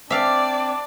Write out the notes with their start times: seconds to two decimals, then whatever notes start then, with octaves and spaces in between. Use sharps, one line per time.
0.10 C4 D4 D5 E5 F5